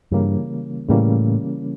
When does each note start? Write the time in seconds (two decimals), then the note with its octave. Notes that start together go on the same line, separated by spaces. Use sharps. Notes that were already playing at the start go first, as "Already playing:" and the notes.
0.12 G2 C#3 E3 G3 A#3 C#4
0.88 A2 C#3 E3 G3 A#3 C#4